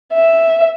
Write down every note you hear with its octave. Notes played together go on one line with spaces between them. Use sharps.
E5